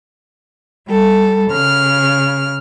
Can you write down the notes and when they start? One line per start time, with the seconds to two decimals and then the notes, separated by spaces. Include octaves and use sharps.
0.89 G3 A4
1.51 C#3 F6